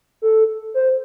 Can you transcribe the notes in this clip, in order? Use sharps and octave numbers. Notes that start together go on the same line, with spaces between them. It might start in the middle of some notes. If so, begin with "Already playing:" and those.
A4
C5